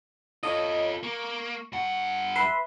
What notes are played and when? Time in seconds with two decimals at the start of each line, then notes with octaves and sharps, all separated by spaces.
0.43 F4 A4 C#5 D#5
1.03 A#3 C#6
1.73 G2 F#5
2.36 B4 E5 C6